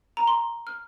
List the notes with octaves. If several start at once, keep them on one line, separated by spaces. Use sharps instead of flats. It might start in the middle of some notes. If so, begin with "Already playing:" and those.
A#5
C6
F6